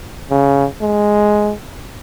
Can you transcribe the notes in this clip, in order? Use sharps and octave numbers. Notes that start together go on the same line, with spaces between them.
C#3
G#3